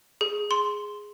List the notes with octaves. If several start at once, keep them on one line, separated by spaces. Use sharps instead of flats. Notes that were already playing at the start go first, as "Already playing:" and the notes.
G#4
C6